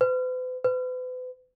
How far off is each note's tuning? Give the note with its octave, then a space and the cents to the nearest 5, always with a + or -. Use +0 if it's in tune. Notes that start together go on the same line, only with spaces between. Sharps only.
B4 +45
B4 +40